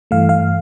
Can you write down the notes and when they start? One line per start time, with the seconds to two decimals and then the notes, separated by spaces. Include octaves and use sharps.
0.11 G2 E3 A3 F5
0.29 F5